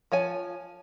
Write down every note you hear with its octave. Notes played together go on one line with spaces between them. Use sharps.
F3 C#5 G#5